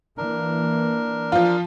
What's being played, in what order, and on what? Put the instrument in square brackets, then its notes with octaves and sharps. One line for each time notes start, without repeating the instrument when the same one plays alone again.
[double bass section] E3 A#3 [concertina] D4 A#4
[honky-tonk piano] F3 F4